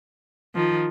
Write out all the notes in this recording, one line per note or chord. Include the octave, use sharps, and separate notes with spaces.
D#3 F3